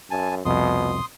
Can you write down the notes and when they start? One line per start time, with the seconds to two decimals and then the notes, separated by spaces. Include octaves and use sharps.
0.11 F#2 G#5 A5
0.45 C2 F2 B2 C6 D#6